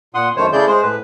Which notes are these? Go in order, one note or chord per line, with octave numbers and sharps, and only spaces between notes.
A#2 F#5 C6 D#6
F#2 D#3 A3 C5 C#5
C#3 A3 E4 G#4 D5 G6
G#3 G#4 C5
A2 B4